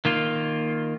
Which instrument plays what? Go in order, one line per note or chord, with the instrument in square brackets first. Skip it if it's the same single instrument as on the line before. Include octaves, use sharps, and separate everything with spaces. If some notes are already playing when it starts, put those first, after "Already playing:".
[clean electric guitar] D#3 A#3 F4